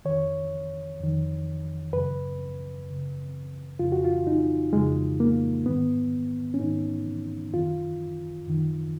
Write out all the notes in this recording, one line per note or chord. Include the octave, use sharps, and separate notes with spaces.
F2 D#3 C#5
F2 D#3
F#2 C#3 B4
F#2 C#3
F2 C#3 F4
F#4
F4
D#4
F2 C#3 G#3
A#3
G#2 D#3 B3
C#4
G#2 D#3 D#4
F#2 D#3 F4
F#2 D#3